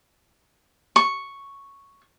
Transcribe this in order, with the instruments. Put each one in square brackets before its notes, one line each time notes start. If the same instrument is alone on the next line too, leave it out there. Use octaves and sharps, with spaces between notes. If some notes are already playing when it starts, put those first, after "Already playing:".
[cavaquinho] C#6